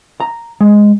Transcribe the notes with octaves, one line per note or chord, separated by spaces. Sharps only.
A#5
G#3